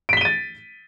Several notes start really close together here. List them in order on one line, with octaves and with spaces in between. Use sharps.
D7 B6 G7 D#7 A6